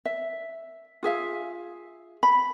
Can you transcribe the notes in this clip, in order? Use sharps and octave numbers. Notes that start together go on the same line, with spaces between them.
E5
F4 G#4 E5 F5
B5